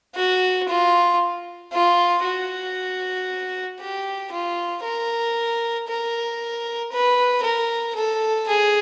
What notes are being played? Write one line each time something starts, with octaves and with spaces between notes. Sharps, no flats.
F#4
F4
F4
F#4
G4
F4
A#4
A#4
B4
A#4
A4
G#4